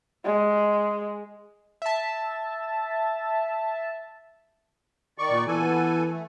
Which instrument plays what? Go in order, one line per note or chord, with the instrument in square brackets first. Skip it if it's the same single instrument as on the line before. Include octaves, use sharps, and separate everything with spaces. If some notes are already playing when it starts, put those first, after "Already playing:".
[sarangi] G#3
[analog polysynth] E5 A5
[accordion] D#3 D5 C#6
[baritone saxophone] A#2
[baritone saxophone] E3 [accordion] B3 A4 G#5
[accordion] A3